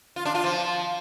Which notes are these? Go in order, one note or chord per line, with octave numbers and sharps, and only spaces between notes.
F4
D4
F4
F3